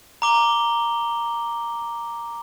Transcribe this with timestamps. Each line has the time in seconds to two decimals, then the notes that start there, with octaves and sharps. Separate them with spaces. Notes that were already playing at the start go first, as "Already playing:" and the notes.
0.22 A#5 D6 G7